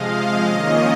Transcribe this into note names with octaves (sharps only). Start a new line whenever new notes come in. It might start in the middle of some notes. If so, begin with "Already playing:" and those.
Already playing: C3 F3 G#3 D#5 F5
F5
D#3 A#3 C#4 F4 D#5